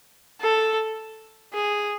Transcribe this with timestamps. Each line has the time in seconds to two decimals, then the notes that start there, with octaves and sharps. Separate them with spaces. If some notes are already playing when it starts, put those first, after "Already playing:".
0.41 A4
1.53 G#4